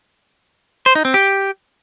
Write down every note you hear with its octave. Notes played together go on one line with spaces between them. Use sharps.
C5
D#4
C4
G4